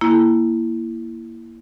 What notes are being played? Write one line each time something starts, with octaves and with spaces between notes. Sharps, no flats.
A#3 E4